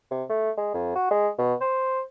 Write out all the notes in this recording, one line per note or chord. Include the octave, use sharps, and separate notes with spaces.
C3
A3
G#3
F2
F#4
G#3
B2
C5